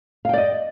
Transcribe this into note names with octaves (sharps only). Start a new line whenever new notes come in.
D5 D#5 F5 G5